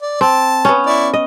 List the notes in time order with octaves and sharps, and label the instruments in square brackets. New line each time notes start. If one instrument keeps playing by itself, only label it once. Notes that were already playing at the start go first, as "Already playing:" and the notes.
[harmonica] D5
[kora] C4 [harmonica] A5
[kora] B3 C#4
[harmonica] E4 D5 C#6
[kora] D#5